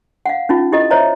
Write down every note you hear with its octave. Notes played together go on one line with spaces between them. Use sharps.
F5 F#5
C#4 D#4 F4
E4 G4 A4 D#5
C5 C#5 D#5 E5 A#5